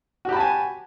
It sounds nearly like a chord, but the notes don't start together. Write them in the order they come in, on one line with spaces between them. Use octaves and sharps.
F#4 G4 B5 A5 G#5